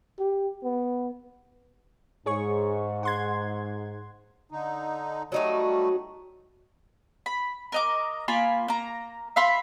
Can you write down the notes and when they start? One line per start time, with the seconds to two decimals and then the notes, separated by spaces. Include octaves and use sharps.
0.19 G4
0.64 B3
2.26 G#2 G#4 C#5 C#6
3.03 F#5 C6 G#6
4.51 D3 D#4
5.32 F#3 G3 A3 D#4 F#4
7.26 B5
7.72 A#4 D#5 D6
8.28 A#3 F4 G#5 B5
8.68 A#3 A#5
9.36 E5 F5 B5 C6